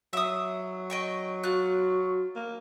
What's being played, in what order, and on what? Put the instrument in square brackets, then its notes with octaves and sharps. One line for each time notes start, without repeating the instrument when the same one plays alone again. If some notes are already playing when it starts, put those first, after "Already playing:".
[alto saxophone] F#3 [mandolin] E5 D#6
[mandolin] D#5 G5 C#6
[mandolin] F4 F#6 [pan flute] F#4
[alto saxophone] A#3